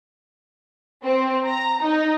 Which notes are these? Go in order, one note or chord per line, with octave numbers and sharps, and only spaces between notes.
C4
A#5
D#4